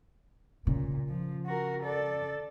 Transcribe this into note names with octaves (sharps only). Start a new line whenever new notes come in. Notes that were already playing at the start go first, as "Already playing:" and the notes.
A#2 C#3
F3
F#4 A#4
A4 D5